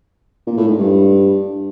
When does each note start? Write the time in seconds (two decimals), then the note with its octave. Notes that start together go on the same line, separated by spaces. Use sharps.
0.47 A#2
0.57 A2
0.68 G#2
0.78 G2